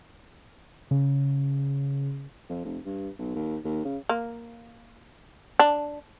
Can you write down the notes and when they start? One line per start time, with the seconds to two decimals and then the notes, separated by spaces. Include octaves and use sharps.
0.91 C#3
2.49 F2
2.65 F1
2.86 G2
3.19 B1
3.35 D#2
3.64 D#2
3.85 C#3
4.09 A#3
5.59 D4